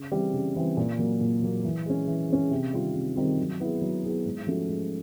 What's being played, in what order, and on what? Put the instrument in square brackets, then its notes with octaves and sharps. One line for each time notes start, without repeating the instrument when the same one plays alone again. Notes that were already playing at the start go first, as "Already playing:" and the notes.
Already playing: [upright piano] C#3
E3 G3 C4
C#3
E3 G3 C4
A#2
F#3 A#3
A#2
F#3 A#3
E3
G#3 C#4
E3
G#3 C#4
C3
D#3 G3 C4 F4
C3
D#3 G3 C4 F4
F#3
B3 E4 G#4
F#3
B3 E4 G#4
G#2
F3 A3 C#4 F#4
G#2